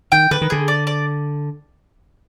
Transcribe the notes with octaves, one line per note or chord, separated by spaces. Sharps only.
D#3 G5
D3 B4
D#3
D3 G#4
D5
D5